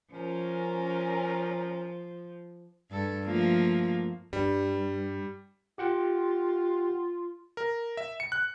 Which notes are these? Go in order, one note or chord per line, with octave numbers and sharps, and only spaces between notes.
F3 C#4 A#4
G2 A4
F3 A3 A#3
G2 G3
F4 G4 F#5 G5
A#4
E5
C#7
F#6